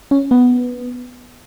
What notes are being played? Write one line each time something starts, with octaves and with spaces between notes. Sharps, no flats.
C#4
B3